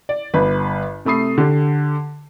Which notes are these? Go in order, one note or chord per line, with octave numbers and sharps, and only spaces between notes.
D5
G1 B4
C3 A3 B5 D#6 C7
D3 G4